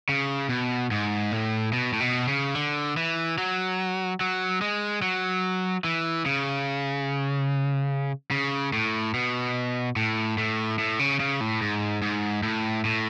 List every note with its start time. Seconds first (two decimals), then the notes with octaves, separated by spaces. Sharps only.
0.09 C#3
0.49 B2
0.91 G#2
1.32 A2
1.73 B2
1.93 A2
2.00 B2
2.28 C#3
2.55 D3
2.97 E3
3.38 F#3
4.21 F#3
4.61 G#3
5.02 F#3
5.84 E3
6.26 C#3
8.31 C#3
8.73 A2
9.14 B2
9.96 A2
10.38 A2
10.79 A2
10.99 C#3
11.20 C#3
11.41 A2
11.61 G#2
12.02 G#2
12.43 A2
12.85 A2